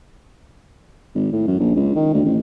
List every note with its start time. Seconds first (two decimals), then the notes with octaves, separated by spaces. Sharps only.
1.15 G#1
1.32 A2
1.47 F#2
1.60 A#1
1.76 C#2
1.95 D#3
2.13 D2
2.25 A1